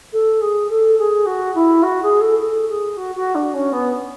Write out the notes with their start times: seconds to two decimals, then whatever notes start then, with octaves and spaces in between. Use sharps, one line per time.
0.12 A4
0.40 G#4
0.69 A4
0.98 G#4
1.25 F#4
1.54 E4
1.82 F#4
2.02 G#4
2.20 A4
2.39 A4
2.68 G#4
2.96 F#4
3.15 F#4
3.34 D4
3.53 C#4
3.72 B3